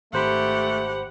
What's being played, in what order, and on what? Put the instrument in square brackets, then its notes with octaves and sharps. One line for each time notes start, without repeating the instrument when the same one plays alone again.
[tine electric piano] G#1 C5 B5 [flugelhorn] A3 [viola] G4 F#5